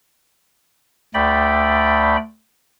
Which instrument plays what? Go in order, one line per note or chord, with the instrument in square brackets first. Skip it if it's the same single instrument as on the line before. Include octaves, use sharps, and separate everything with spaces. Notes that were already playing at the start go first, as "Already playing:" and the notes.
[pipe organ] D2 A3 D5 G5 B5